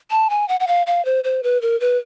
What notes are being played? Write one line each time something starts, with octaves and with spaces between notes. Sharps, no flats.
A5
G#5
F#5
F#5
F5
F5
C5
C5
B4
A#4
B4